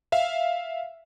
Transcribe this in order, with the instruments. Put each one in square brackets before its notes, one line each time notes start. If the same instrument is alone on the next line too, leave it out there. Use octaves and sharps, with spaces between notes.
[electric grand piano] E5 F5